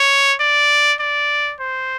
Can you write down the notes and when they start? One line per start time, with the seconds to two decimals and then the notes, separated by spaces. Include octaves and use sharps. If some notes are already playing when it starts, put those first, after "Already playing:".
Already playing: C#5
0.40 D5
1.00 D5
1.60 C5